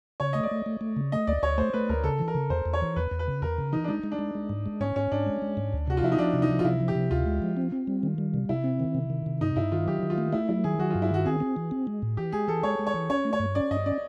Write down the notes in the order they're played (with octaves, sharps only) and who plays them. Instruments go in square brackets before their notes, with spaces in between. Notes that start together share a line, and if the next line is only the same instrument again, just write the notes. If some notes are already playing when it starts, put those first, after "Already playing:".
[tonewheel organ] C#3 [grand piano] C#5
[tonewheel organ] A3 [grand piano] D#5
[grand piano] D5
[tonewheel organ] A3
A3
A3
C#3
[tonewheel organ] A3 [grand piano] D#5
[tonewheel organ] D2 [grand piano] D5
[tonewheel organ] D2 [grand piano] C#5
[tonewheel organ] A3 [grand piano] C5
[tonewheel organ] A3 [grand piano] B4
[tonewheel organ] D2 [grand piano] A#4
[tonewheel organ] C#3 [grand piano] A4
[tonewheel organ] E3
[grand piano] A#4
[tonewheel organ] C#3
[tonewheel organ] E2 [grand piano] C5
[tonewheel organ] E2
[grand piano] C#5
[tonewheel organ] E3
[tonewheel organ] E2 [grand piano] B4
[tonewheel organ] E2
[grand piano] B4
[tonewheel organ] C#3
[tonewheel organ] E2 [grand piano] A#4
[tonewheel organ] C#3
[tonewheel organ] E3 [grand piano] D#4
[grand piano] D4
[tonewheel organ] G#3 [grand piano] D#4
[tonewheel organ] G#3
[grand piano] D4
[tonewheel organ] G#3
G#3
G#2
G#3
[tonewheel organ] G#2 [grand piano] C#4
[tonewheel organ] G#2 [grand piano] C#4
[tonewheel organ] G#2 [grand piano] D4
[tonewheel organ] G#3
G#3
G#2
D2
[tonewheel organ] C3 [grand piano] F#4
[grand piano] F4
[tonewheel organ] F3 [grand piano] E4
[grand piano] D#4
[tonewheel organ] F3 [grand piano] D4
[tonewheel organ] C3
[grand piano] D#4
[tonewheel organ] F3
[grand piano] F4
[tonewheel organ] C3 [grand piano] E4
[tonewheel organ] F3
[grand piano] G4
[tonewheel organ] C3
[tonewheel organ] D2 [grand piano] F4
[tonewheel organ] G#3
F3
C4
C4
G3
D#3
G3
C3
[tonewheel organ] C3 [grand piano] E4
[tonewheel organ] C4
D#3
C3
D#3
C3
[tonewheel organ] G2 [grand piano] D#4
[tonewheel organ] G2 [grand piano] E4
[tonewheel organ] D#3 [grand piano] F4
[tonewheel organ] F#3 [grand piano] G4
[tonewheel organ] D#3
[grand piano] F4
[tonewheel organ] A3
[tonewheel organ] A3 [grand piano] E4
[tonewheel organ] F#3 [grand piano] E4
[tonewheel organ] D#3 [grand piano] G#4
[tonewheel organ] F#3 [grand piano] F#4
[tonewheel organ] G2 [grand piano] F4
[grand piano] E4
[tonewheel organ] D#3 [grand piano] F#4
[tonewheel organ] C4 [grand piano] G#4
[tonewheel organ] C4
E3
C4
G#3
A2
[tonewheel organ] E3 [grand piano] G4
[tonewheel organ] G#3 [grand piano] G#4
[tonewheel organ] E3 [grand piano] A4
[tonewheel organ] G#3 [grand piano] C#5
[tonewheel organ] G#3
[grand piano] C#5
[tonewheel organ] E3
[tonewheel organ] C#4 [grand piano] C#5
[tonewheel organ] A3
[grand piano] C#5
[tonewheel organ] G2
[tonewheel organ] C#4 [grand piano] D5
[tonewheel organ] G2 [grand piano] D#5
[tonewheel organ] C#4 [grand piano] D5